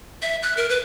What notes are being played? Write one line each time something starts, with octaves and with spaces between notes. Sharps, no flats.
E5
F#6
A#4
B4